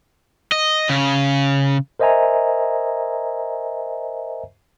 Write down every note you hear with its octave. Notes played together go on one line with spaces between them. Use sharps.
D#5
C#3
A#4 C5 D#5 E5 G#5 A#5